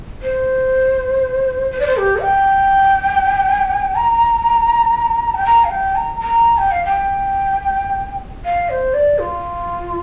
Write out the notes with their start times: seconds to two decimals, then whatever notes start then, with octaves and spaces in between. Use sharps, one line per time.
0.22 C5
1.72 C5
1.80 D5
1.86 C5
1.97 G4
2.22 G5
3.95 A#5
5.34 G5
5.45 A#5
5.64 F5
5.70 G5
5.95 A#5
6.20 A#5
6.58 G5
6.71 F5
6.85 G5
8.45 F5
8.69 C5
8.93 D5
9.19 F4